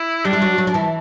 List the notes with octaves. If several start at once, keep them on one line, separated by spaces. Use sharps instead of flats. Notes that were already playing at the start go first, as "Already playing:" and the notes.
Already playing: E4
G3 D4 G4
E4
F#3 F#4
F#3 F#4
D4
E3 E4